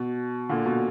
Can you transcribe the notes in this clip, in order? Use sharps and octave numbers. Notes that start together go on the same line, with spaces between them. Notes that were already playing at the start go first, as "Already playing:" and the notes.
Already playing: B2
A#2 D3
B2